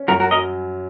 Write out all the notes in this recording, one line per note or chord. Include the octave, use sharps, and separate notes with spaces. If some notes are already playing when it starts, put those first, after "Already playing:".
Already playing: C#4
F#2 F#4 A#4
F#4 A#4
F#3 A#4 D#5